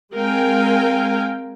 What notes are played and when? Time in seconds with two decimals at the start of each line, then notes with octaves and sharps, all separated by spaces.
0.14 G#3 C4 A#4 F5 G5 G#5